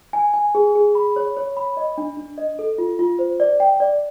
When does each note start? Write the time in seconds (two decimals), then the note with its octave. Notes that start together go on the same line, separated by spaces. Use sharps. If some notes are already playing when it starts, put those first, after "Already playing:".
0.13 G#5
0.34 G#5
0.55 G#4
0.75 G#4
0.95 B5
1.16 C#5
1.37 C#5
1.57 B5
1.77 D#5
1.98 D4
2.17 D4
2.38 D#5
2.59 A4
2.78 F4
2.99 F4
3.19 C5
3.40 D5
3.60 G5
3.80 D5